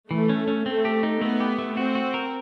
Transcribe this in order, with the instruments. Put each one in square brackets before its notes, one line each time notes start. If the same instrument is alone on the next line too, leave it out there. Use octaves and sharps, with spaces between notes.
[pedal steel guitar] E3 [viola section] A3
[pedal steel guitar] C#4
C#4
[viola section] A3 [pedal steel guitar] C4
[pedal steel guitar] G4
D#4
[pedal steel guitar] A3 [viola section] B3
[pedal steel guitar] G4
A3
[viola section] C4 [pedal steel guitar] F#4
[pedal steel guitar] F#4
A#4